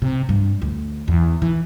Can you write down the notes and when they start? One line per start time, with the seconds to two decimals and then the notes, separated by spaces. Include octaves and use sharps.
0.02 C3
0.29 G2
0.62 D2
1.08 E2
1.42 E3